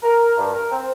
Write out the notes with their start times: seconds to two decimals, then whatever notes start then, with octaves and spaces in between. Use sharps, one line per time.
0.03 A#4
0.37 G2
0.54 A#4
0.72 C4